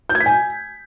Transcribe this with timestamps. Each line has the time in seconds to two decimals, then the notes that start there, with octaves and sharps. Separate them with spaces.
0.09 G6
0.15 G#6
0.21 B6
0.26 G#5